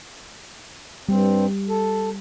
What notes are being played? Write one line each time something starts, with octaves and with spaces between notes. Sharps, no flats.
G2 G3 C4
A4